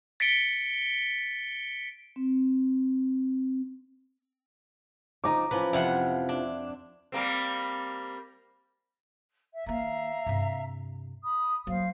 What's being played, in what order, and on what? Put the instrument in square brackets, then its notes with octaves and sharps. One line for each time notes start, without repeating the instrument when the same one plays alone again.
[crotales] A6 B6 C#7 D7 G7
[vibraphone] C4
[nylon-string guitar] F3 D#4 [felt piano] A#5 D6
[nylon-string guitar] E3 F3 C#4 [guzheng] B4
[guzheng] F2 C3 F#5 [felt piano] E5
[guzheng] D4
[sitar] G3 A#3 C4
[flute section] E5
[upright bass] D#3 A#3 [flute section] E5 F5 A#5
[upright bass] G2 C3
[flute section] B5 D#6
[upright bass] F#3 A#3 [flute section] C5 F5